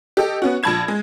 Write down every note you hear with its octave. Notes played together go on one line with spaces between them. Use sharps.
G4 A4 D#5
B3 C#4 F#4
A#1 F3 A5 B5 G#6 E7
G#3